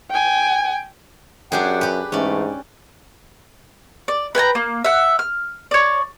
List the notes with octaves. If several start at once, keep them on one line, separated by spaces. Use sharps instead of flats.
G5 G#5
F#2 D4 G4 G#4 F#5 G5
G4 B4
G#2 E3 A3 C#4 D5
D5
B4 G5 G#5 A#5
A#3
E5 F#5
F6
C#5 D5